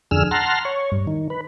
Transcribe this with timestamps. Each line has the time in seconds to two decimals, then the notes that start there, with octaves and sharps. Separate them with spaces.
0.11 F2 D3 G#4 E6 F6
0.31 F#5 A5 A#5 C6 F6
0.65 C#5
0.92 G2
1.07 D#3
1.30 B4